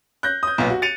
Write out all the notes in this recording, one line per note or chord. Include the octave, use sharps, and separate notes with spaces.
F#6 G6 A#6
D#6 G6
B1 A#2 B3
F#4
A6 C#7 D#7 F7